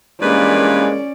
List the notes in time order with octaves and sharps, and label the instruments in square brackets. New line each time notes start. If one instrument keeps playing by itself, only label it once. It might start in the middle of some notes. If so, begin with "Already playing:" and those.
[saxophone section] G2 E3 B4 [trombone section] G#3 A#3 [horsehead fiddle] C#4 D5